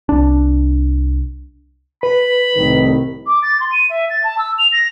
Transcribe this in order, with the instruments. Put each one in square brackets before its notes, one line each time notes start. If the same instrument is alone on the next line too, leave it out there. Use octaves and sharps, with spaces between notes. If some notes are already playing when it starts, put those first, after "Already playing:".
[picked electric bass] C2 D4
[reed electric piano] B4 [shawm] B5
[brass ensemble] C2 A2 D#3
[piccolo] D6
A6
C6
D#7
E5
A6
A5
E6
F7
A#6